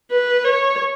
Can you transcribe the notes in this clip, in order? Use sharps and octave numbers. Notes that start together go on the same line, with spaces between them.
B4
C#5